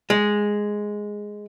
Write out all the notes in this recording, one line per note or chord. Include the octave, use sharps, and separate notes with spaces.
G#3